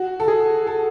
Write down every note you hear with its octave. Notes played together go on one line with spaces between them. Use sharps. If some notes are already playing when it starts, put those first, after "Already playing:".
Already playing: F#4
A4
G#4
A4